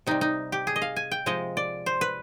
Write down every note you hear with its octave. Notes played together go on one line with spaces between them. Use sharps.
C3 G3 D#4
D#4
G4
G#4
D#5
F5
G#5
G5
C3 F3 G#3 D#5
D5
C5
B4